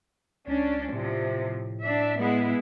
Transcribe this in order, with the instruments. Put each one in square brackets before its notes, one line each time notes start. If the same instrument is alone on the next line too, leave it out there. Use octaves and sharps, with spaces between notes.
[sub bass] C#2 [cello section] C#4 D4
[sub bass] A2 [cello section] C3 F3
[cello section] D4 E5
G#3 B3 E4